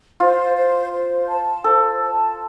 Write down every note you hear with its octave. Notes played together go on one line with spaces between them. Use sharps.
F4 C5
C5
C5
A5
A4 C5
A5